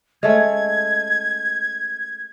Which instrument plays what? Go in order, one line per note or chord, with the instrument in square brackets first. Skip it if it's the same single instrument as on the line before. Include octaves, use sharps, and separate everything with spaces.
[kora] G#3 A3 C#4 [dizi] G#6